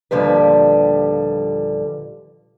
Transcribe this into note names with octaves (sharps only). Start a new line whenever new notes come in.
D#2 A#2 D3 F3 G3 B4